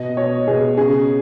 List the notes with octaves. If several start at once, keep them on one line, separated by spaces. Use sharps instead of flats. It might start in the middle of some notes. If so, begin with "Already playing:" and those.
Already playing: B2 D#5
B2 C#5
B2 G#4
C#3 G#4